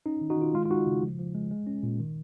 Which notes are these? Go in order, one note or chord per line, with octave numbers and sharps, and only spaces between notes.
C#4 D#4
D#3
D#4 F#4
D#3 F4
G#3 F4
F4
G#3 D#4 F#4
C#3
F3
F3
G#3
G#3
C#4
A#2
D#3